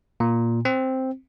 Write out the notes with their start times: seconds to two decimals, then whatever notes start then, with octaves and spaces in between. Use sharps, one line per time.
0.20 A#2
0.65 C4